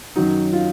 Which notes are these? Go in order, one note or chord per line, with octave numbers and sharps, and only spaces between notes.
F#2 D#3 F#3 D#4
F4